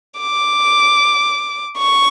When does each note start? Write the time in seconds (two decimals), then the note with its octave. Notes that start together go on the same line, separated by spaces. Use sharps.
0.20 D6
1.78 C#6